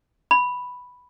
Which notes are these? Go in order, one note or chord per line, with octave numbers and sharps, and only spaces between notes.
B5